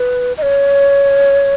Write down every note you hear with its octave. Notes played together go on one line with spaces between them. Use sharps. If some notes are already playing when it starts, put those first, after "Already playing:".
Already playing: B4
D#5
C#5